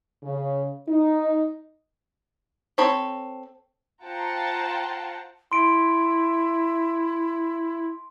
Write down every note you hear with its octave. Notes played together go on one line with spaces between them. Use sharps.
C#3
D#4
C4 A4 C#5 B5
F4 C5 F#5 G5 A5 A#5
E4 C6 D7